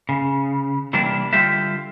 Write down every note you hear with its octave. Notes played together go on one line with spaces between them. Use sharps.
C#3
C3 E3 G3 A#3 D4
D3 G3 F4 G4 A4 E5